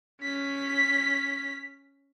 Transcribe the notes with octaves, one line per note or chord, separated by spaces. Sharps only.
C#4 B6